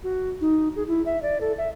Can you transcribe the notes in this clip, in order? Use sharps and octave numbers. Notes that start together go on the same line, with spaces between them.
F#4
D#4
G#4
E4
E5
D5
A4
E5